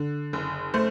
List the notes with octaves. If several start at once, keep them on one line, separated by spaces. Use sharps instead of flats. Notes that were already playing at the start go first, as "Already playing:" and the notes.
Already playing: D3
F#1
A3 C5